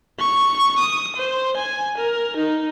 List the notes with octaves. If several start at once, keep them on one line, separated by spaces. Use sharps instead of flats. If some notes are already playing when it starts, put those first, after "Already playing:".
C#6
D#6
C5
G#5
A#4
D#4